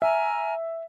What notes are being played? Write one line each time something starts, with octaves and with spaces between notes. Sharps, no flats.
E5 G#5 A#5 F6